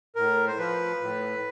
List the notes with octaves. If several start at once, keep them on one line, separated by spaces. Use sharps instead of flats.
A2 A#4
C5
F3 B4
A2